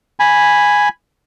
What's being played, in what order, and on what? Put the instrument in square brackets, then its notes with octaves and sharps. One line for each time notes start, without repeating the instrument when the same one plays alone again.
[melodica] G#5 B5